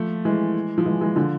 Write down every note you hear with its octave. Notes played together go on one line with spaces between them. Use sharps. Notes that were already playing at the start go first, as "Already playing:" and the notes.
Already playing: F3 A3
E3 G#3
F3
E3 G#3
E3 G#3
D3 F3